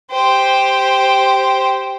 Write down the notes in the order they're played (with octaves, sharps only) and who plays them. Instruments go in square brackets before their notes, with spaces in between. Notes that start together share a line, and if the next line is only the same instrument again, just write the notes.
[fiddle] G4 C5